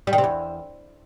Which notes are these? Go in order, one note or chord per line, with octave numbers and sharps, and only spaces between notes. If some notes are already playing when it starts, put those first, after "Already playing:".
G3
D#3
C3
E2